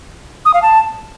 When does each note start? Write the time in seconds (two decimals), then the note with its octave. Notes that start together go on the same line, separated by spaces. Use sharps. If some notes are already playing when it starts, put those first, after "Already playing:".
0.45 D#6
0.54 F5
0.62 A5